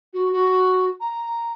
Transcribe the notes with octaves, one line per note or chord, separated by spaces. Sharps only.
F#4
F#4
A#5